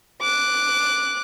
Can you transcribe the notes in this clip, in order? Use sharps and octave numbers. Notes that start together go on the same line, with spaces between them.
D6 F#6